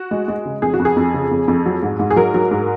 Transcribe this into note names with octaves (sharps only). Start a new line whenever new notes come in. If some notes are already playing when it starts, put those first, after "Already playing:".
Already playing: F#4
G#3
G#3
C#3
F2 G#4
F#4
F2
G#4
F2
C#3
F2
F2
F#3
G#2
G#2
G#4
F#3 A#4
F#3
G#2